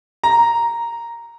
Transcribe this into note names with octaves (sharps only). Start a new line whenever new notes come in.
A#5